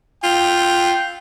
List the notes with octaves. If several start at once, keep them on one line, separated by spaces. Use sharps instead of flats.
F4 G5